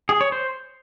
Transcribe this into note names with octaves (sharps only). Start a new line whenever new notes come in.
G#4
C#5
C5